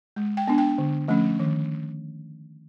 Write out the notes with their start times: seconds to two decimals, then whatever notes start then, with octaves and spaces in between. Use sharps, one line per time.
0.16 G#3
0.37 G5
0.48 B3 D4
0.58 G5
0.78 D3
1.08 F3 A3 C#4
1.39 D#3